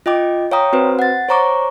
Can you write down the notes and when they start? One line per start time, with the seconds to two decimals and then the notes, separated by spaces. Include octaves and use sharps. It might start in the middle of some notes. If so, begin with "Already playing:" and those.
0.06 F4 D#5 G5 D6
0.51 C#5 F5 G5 A#5 D#6
0.73 C4 F#4 B4 C5
0.99 F#5 A6
1.29 C5 C#5 A#5 C#6 D6